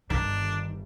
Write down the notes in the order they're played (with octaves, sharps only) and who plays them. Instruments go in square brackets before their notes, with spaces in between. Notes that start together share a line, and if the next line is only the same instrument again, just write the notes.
[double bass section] G1 G2 [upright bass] D#3 [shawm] D4